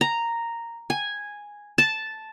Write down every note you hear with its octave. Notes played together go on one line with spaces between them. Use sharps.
A#5
G#5
A5